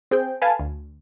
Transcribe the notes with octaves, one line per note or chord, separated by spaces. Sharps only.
C4 G#4 G5
A4 B4 F5 G#5 A5
D2